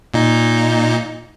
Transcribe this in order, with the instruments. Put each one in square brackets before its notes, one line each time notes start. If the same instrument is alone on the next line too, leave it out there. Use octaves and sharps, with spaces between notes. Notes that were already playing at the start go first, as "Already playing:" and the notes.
[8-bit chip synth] A#2 D#4